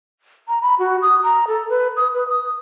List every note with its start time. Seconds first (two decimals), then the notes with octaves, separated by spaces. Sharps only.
0.48 A#5
0.62 B5
0.79 F#4
1.02 D#6
1.24 A#5
1.48 A4
1.69 B4
1.97 D#6
2.14 B4
2.29 D#6